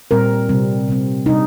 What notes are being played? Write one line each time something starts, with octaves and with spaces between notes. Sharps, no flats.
A#2 G3 C4 A#4
C3 G3 C4
C3 G3 C4
C3 G3 D4 D#4